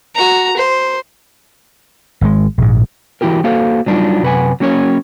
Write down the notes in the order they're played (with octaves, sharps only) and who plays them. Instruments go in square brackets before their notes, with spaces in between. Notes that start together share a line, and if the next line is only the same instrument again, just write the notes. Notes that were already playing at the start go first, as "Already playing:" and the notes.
[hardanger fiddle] F#4 A#5
C5
[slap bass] G#1 B2 G#3
A#1 G#2
[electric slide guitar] E3 E4 F#4 G4 A#4
A#3 F#4 A4 C5 F5
F#3 G3 D4 D#4 F4
F#2 C3 B4 F#5 G#5
F#3 A#3 C#4 A#4 C#5